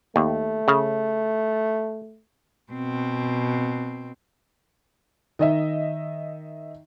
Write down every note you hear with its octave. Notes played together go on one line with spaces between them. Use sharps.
D#2 A3
C#3
B2 C4
D#3 D#5 E5